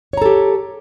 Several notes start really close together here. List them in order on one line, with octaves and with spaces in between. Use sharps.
C#5 A#5 A4 G4